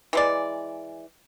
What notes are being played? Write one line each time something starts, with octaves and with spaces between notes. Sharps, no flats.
E3 G#3 D5